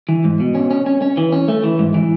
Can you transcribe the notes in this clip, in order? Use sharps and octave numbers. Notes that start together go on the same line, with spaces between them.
E3
G#2
B2
C#4
C#4
C#4
C#4
E3
C#4
A3
E3
G#2
E3